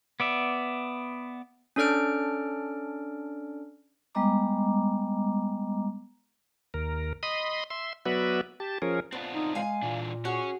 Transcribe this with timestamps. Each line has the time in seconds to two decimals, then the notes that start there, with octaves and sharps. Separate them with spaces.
0.20 B3 D5 E5
1.76 C#4 D4 A4 D5 F6 D7
4.15 G3 G#3 B3 D#5 A#5 D6
6.74 D#2 A#4
7.23 D#5 B5 C6 D#6
7.70 E5 C6
8.06 F#3 B3 F#4 B4 D5 E5
8.60 G4 A5
8.82 F3 C#4 G#4 A#4
9.13 B3 C4 D4 F4
9.34 D#4
9.55 G#3 F5 G#5
9.83 A#2 E3 D4
10.25 C#4 F#4 G#4